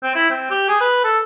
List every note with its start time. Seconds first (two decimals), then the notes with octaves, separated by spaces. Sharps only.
0.03 C4
0.15 E4
0.30 C4
0.50 G4
0.69 G#4
0.81 B4
1.04 A4